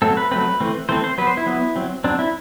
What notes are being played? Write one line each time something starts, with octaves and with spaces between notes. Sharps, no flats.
F#3 A3 C4 A4
B4
F#3 A3 C4 B4
E3 A3 C4
E3 A3 C4 C5
C5
F#3 B3 B4
C5
E4
F#3 B3
F#3 C4
F#3 C4 D4
E4